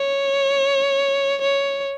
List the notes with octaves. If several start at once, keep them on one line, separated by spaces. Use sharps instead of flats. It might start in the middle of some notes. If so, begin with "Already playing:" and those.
Already playing: C#5
C#5